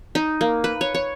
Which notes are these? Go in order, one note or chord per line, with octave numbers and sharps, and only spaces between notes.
D#4
A#3
B4
C#5
C#5